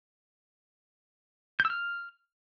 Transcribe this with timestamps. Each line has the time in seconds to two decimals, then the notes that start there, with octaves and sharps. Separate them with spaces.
1.60 G6
1.65 E6
1.70 F6